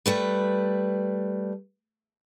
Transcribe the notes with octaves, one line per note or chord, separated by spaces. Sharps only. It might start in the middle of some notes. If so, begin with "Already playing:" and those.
G3 A3 B4